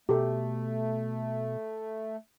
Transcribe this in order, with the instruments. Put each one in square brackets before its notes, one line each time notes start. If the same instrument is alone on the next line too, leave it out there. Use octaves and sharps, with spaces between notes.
[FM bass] B2 [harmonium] A3 [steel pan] G4 A4